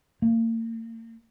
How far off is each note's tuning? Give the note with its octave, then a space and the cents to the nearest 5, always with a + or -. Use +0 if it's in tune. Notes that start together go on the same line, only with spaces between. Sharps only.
A#3 -40